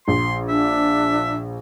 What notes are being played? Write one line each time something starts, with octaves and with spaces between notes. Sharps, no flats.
A#1 C6
D4 E5